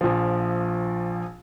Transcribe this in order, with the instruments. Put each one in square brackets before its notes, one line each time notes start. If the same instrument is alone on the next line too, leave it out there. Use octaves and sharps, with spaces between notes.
[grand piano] A#1 F3